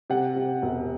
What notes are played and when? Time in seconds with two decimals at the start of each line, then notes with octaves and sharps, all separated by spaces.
0.10 C3 F#5
0.36 C3
0.62 E1